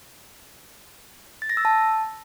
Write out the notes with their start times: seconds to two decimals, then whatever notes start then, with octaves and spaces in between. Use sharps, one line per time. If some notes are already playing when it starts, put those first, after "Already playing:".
1.42 A6
1.50 A#6
1.57 E6
1.65 A5